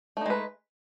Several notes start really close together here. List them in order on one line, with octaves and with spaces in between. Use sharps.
A3 D#4 G#3 B4